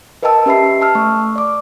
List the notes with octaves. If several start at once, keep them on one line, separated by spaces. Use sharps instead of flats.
A#4 B4 D#5 G5 A5 E6
C#4 G4 B4 E5 B5 C7
A5 E6 F6
A3 C#6
D5 D6